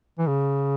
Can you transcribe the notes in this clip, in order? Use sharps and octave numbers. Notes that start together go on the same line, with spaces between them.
E3
C#3